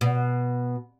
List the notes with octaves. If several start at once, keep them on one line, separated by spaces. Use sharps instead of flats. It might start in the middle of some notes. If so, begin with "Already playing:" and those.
B2